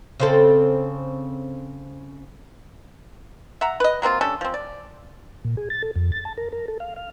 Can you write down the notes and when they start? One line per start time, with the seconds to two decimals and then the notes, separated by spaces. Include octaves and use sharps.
0.20 C#3 C4 A4
3.61 E5 F#5 A#5
3.80 B4 D#5
4.02 F#3 A#3 C4 F4
4.21 G3 C#4 D4 A4
4.41 F3 C4
4.54 D5
5.45 A#2
5.57 G#4
5.70 A6
5.82 A4
5.96 F2
6.12 A6
6.25 A5
6.38 A#4
6.52 A#4
6.68 A4
6.80 F5
6.96 F5